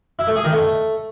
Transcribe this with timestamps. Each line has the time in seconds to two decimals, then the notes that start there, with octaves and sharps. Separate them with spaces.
0.19 E4
0.27 A3
0.36 G#4
0.44 D#3
0.53 A3